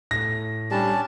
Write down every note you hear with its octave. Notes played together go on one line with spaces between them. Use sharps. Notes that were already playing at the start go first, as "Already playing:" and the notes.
A2 A#6
G3 C#4 D4 A5